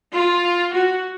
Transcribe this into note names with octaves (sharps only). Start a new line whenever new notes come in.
F4
F#4